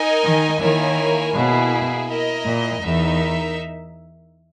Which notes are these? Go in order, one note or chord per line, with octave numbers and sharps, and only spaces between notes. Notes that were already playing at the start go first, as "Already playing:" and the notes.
Already playing: D#4 A#4 D#5 G#5
D#3
D#3 A#3 E4 A#4 C#5 G#5
B2 A#3 E4 G#4
E4 A#4 D#5
A#2
E2 D#4 A#4 E5